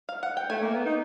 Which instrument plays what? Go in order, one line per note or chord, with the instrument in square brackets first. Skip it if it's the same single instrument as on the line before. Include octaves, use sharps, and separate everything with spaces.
[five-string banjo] F5
F#5
G5
[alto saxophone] A3 [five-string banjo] G#5
[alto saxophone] A#3
B3
D#4